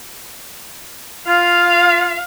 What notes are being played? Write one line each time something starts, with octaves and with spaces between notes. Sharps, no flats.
F4 F5